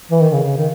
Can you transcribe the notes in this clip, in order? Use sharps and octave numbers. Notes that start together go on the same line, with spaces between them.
E3
D#3
C#3
C#3
D#3